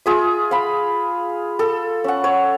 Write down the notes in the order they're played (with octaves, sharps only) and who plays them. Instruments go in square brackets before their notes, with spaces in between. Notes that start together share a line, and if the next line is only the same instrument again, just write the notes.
[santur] F4 G#4 E5
F5 B5
A4
C#4 F#5
C#5